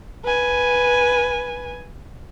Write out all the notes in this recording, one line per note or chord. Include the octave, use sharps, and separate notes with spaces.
B4 G#5